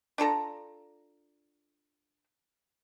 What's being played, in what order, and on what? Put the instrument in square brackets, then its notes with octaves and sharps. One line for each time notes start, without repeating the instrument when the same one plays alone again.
[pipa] D4 F4 A4 A#5